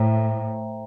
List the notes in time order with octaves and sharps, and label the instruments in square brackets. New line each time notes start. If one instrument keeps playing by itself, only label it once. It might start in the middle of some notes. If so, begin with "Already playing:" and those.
Already playing: [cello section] A2 [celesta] C5 E5 G5 A#5